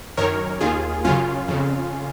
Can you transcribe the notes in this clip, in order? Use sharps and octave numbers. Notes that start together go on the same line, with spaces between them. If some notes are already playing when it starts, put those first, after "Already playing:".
F#2 D#3 A#4 C#5
D#2 D#3 F4 G#4
F#2 C#3 C#4 F4
F2 C#3